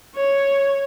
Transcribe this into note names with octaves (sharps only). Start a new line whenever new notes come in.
C#5